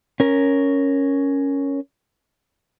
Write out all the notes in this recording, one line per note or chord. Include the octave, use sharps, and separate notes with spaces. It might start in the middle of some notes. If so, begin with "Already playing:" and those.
C#4 A#4